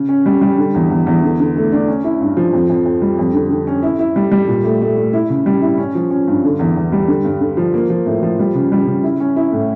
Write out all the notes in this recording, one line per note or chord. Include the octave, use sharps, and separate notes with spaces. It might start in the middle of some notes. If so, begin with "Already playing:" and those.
Already playing: C#3
C#4
G3
G3
D3
E2
E2
E2
D3
D3
A3
D4
C#4
E4
G2
F3
F2
F2
F2
G3
F2
D3
D3
C#4
E4
E4
G3
G3
A#2
A3
A3
A3
E4
C#3
G3
E4
C#4
F3
C#4
G2
D3
E2
E2
G3
D3
G2
D3
F3
A#3
F3
A2
F3
G3
C#3
G3
C#3
E4
C#4
E4
A2